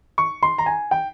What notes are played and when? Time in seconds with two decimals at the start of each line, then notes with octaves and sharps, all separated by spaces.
0.18 C#6
0.43 C6
0.58 A#5
0.66 G#5
0.91 G5